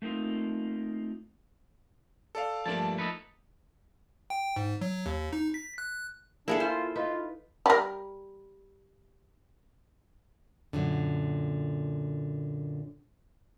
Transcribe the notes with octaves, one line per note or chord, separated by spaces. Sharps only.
A3 A#3 C4 D#4 F4
A4 D5 F5
G2 F3 A3 A#3 D4 A5
D#4 A4 B4
G5
G#2
F#3
D#2
D#4
B6
F#6
A#3 D4 E4 G#4 A4
F4 C5
D#4 F4 B4
G3 A#4
F#2 A#2 D3